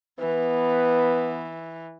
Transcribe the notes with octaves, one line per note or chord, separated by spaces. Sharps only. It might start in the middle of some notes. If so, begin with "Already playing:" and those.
E3 B3 B4